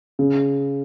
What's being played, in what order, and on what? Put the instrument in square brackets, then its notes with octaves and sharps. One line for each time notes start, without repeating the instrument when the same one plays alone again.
[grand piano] C#3